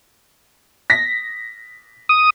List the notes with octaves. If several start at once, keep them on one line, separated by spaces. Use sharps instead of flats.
A#6 B6
D#6